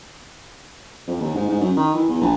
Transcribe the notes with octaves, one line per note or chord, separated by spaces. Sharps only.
F2
D#2
G#2
G#2
F#2
D#3
E3
E2
A#1